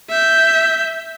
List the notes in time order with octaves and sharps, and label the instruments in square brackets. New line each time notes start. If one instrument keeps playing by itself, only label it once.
[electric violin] E5 G6